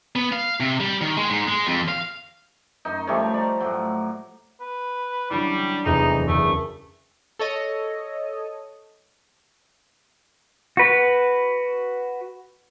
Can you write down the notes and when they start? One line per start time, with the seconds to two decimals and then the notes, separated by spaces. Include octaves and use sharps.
0.16 B3
0.32 F5
0.60 C3
0.80 G3
1.01 D#3
1.17 G#3
1.30 G#2
1.48 G#3
1.67 F2
1.89 F5
2.85 F#2 D#4
3.07 F3 G3 A3 C#5
3.34 D5 A#5
3.60 A2 F#3
4.61 B4
5.31 F#3 G3 D4 E4
5.85 F1 E2 D#4
6.28 F#1 E2 A3
7.39 A4 C#5 D#5
10.77 F#4 B4